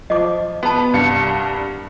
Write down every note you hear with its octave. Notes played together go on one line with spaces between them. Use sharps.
F3 D#5 D6
B3 F#4 A5
C2 G2 C#7